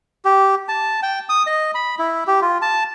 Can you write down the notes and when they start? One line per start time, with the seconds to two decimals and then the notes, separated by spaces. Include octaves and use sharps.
0.25 G4
0.69 A5
1.03 G5
1.29 D#6
1.47 D#5
1.75 B5
1.99 E4
2.27 G4
2.42 F4
2.62 A5